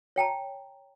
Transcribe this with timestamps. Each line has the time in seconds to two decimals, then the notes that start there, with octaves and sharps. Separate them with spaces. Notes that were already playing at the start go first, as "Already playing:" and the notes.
0.16 C#5 G5 A5 A#5